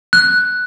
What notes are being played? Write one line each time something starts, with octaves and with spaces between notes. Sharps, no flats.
F#6